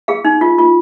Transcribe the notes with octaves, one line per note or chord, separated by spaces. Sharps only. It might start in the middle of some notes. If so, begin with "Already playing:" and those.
G#4 F5
D#4
F4
F4